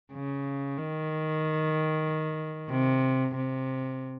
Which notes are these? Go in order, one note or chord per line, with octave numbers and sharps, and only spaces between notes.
C#3
D#3
C3
C3